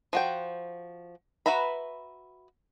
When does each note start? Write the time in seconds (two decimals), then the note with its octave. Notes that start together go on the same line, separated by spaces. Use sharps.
0.13 F3 F#4 G5
1.46 F#4 B4 E5 A#5 B5